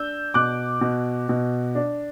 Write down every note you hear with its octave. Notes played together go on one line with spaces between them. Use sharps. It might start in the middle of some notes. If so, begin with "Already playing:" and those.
Already playing: D4 E6 G6
B2 D6 F#6
B2
B2
D4